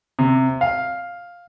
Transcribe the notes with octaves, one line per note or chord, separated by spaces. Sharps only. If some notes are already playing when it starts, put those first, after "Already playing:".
C3
F5